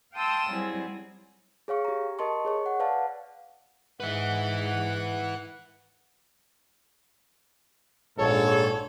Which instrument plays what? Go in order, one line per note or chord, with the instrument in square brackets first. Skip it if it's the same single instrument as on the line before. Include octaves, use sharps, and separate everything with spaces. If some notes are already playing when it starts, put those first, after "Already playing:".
[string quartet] F5 G5 A5 C6 D#6 E6
F#3 G3 C4 E4 G#4
[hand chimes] G#4 C#5 F5 C#6
G4 A#5
A#4 D#5 A5 C6 C#6
G#4 C#5 C#6
F#5
B4 D5 F5 F#5 A5
[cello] G#2 [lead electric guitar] B4 E5 [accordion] F#5
[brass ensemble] A#1 G#2 A4 [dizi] C#5